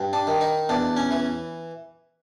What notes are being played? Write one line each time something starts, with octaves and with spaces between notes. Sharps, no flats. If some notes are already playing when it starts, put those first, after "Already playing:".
Already playing: G2
D4
D#3
D#4
E2 D4
C#4
E3